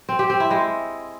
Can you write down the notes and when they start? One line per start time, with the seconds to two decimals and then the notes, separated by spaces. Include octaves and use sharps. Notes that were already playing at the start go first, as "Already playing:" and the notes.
0.09 C4
0.19 G4
0.30 C4
0.40 E4
0.51 G#3